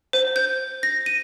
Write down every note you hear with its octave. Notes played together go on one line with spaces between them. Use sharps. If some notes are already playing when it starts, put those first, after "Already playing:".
C5
G6
A#6
D#7